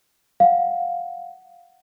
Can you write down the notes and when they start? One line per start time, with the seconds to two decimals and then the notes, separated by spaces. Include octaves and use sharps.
0.40 F5 F#5